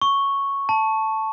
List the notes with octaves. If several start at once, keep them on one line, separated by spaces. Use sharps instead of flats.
C#6
A5